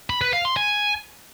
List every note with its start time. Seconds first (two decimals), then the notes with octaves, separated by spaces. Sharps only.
0.10 B5
0.21 B4
0.33 F5
0.45 C6
0.57 G#5